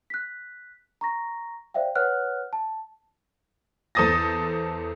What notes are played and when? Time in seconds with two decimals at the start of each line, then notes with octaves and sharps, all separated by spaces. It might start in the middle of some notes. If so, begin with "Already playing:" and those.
0.10 F#6 B6
1.01 A#5 C#6 A#6
1.74 C5 D5 E5 F5 G5
1.95 B4 C#5 F#5 F6 F#6
2.53 A5
3.95 E2 A4 C5 D#6 A6 A#6